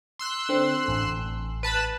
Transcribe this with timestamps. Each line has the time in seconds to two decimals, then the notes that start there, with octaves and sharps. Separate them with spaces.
0.19 C6 E6 F#6
0.49 D3 C4
0.88 A1
1.63 B4 A5 B5